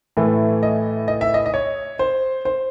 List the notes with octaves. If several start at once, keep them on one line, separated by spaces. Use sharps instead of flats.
A2 E3 A3
D#5
D#5
E5
D#5
D#5
C#5
C5
C5